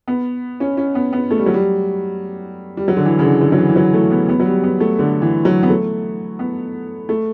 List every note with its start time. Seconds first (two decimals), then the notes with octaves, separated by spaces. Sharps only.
0.08 B3
0.60 C#4
0.77 C#4
0.95 B3
1.13 B3
1.30 A3
1.38 G3
1.46 F#3
1.54 G3
2.77 G3
2.88 F#3
2.97 D3
3.05 E3
3.19 C#3
3.23 D3
3.41 D3
3.52 F#3
3.58 E3
3.69 E3
3.76 F#3
3.94 A3
4.11 B3
4.29 B3
4.40 F#3
4.46 G3
4.63 B3
4.80 A3
4.99 D3
5.22 E3
5.45 F#3
5.63 B3
5.69 A3
6.39 B3
7.09 A3